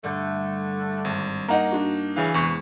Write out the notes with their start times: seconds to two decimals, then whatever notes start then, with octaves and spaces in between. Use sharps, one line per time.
0.04 G2 D3 G3 A3
1.05 G#1
1.48 A#3 D#4 D#5 F#5 A#5
1.72 D4 F#4
2.16 C#3 E3 F5
2.34 E2 C3 G#3 C5 C#6